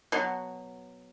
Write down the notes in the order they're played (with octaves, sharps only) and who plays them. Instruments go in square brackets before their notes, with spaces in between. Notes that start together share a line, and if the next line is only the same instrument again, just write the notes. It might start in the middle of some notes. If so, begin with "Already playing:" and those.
[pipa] B2 F#3